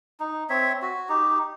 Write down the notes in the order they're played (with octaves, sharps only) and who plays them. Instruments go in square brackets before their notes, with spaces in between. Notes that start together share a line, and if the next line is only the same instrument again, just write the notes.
[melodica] D#4
C4 C#5 E5
F#4
D#4 G4